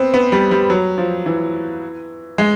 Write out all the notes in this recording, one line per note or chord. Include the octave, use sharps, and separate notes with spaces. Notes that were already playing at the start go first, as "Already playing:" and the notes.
Already playing: B3 C4
B3
G3
G3
F#3
F3
E3
G#3